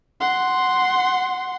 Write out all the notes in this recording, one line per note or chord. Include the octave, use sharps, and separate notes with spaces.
F#5 C6